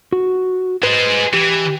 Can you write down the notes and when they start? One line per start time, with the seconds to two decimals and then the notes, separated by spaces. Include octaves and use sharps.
0.13 F#4
0.83 G#4 B4 C5 D#5
1.34 E3 G4